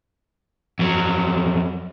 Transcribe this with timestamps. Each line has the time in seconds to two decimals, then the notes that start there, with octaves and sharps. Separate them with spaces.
0.79 F2 F#3